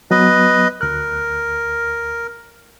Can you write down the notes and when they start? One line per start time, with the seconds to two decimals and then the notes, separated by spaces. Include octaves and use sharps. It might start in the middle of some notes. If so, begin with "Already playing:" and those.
0.11 F#3 B3 B4 D#5
0.81 D2 A#4 F#6